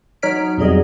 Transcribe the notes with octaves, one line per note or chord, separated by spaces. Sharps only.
F#3 D#4 C#5 F6 B6 D7
F2 B2 F#3 G3 G#4 D#5